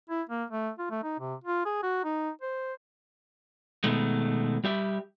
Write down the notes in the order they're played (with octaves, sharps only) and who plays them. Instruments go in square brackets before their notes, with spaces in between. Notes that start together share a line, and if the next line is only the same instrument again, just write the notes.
[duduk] E4
A#3
A3
F4
A3
D#4
C3
F4
G#4
F#4
D#4
C5
[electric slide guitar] B2 D#3 G#3 A3
G3 G4 E5